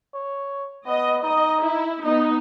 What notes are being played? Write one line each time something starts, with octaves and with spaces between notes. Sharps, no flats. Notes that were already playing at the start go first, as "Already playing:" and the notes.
C#5
B3 D#5
D#4 D#5
E4
B3 D#4 D#5